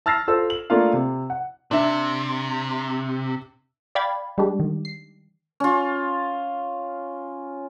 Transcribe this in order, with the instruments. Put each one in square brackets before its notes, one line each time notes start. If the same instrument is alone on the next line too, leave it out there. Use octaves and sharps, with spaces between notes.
[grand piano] A5 E6 F6 A6 A#6 C7
F4 A4 C5 E6
F#7
A3 A#3 D4 F4 A4 F5
C3
F#5
[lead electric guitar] C3 [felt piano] D4 E5
[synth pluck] D5 F5 G5 B5 G#6 A6
G3 G#3 D4 G4
D#3
C7
[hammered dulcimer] C#4 F4